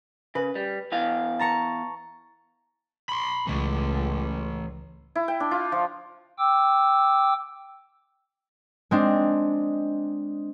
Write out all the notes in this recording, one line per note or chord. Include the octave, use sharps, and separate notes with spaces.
C#3 B4
G3
E2 E4 F5
A5 A#5 C#6
B5 C6
C#2 E3 A3
E4
G5
D4
F4
F3
G5 D6 E6
G#3 C4 D4